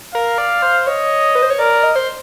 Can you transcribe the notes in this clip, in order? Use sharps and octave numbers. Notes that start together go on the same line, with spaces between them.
A#4 F5
D5
C5
C#5 D#5
B4
C5
C#5
A#4 D5
D#5
C5